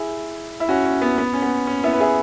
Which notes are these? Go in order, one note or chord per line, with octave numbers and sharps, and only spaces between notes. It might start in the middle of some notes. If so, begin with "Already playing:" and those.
Already playing: E4 G#4
E4
C#4 F#4
C#4
B3
B3
C#4
B3
C#4
B3 E4
B4
E4 G#4